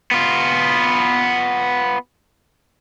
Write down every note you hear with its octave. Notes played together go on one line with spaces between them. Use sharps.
B3 F4